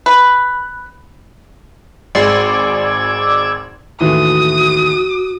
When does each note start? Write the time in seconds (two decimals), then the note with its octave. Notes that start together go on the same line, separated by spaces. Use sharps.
0.06 B4
2.15 G#1 G#3 D5 D6 E6 G#6 C7
4.01 D#2 A2 E3 F#4 D#6